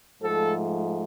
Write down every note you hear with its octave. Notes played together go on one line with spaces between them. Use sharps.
G#2 F3 A3 A4